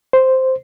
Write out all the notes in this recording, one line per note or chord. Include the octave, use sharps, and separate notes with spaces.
C5